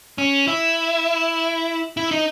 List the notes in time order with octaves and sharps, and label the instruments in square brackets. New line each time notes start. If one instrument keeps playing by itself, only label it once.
[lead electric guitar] C#4
E4
E4
D#4